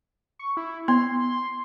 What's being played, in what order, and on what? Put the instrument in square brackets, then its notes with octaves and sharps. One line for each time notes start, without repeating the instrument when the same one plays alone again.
[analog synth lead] C#6
E4
[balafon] B3 [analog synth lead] C6